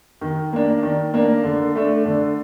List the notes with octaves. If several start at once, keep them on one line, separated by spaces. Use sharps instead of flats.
D#3
A#3 D4
D#3
A#3 D4
D3
A3 D4
D3